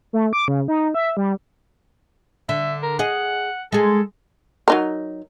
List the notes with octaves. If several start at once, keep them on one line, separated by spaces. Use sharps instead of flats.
A3
D6
C#3
D#4
E5
G3
D3 E5
A#4
G#4 D#5 F#5
G#3 G#4 A4
F#3 D#4 A#4